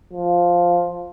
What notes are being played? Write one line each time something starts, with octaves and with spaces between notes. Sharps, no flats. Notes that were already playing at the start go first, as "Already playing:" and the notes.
F3